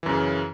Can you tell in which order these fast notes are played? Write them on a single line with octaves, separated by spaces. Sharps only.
E3 F#2 C#3